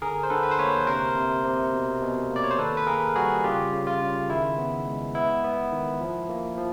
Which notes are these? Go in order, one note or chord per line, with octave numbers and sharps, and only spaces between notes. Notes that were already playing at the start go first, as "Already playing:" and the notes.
D3 G#4 A#4
C5
D3 A4 B4
B4
C5
A#3 B4 C#5
C3 A#4 C5
C3
C3
B2
B2
A#3
D5
C#5
C5
D#3 A4 B4
B4
A#3 G#4 A#4
G3 F#4 G#4
C#3 F4 G4
C#3
F4
C#3
D#3 E4
B3
G#3
B3 E4
B3
D#3
F3
A#3
F3